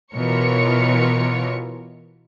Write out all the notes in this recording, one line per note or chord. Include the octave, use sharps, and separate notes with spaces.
B2 E3 F4 A#4 C#5 C#7